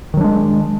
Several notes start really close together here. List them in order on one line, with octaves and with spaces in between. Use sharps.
D#3 F#3 D4 G#3